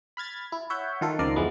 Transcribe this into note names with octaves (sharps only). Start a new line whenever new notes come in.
B5 F6 G#6 A6
E4
C#5 E5 F#5 G6
D#3 F4 A4
C#2 D#3 F3 A#4 D5 C7
F2 E3 G#3 B3